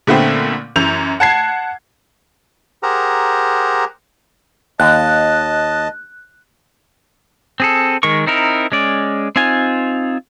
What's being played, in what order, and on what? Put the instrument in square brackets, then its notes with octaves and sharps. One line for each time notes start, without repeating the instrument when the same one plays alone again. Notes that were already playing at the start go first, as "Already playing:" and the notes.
[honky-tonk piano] A#2 D3 A3 B3 C4
F#2 E3 G6 F7
F#5 A5 G#6 C7
[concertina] G4 G#4 A#4 C5 F#5 A#5
[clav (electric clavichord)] D#2 [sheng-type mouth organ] D#5 A5 [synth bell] F#6
[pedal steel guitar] C4 G#4 A4
D#3 G#3 A#4 C#6
C4 D#4 E4 A#4
G#3 C#4 D5
C4 D#4 F4 G#5